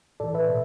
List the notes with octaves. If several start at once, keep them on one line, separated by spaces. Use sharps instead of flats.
A2 E3 A4 D5
B4 E5
B2